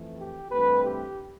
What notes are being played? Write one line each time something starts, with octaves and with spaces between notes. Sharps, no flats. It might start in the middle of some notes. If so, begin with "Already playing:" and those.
Already playing: F2 E3 A3
G4
G2 E3 A3 C4 B4
G4